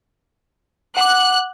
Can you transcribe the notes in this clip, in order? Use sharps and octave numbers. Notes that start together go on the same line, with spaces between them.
F#5 D6 F#6